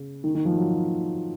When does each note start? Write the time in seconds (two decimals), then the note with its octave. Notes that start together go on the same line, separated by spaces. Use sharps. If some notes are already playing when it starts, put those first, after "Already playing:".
Already playing: C#3
0.24 D#3
0.35 D#3
0.45 F3
0.57 F#3